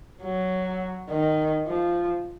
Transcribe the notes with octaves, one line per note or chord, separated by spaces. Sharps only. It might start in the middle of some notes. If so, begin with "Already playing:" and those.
F#3
D#3
F3